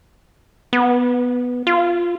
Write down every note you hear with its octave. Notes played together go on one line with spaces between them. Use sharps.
B3
F4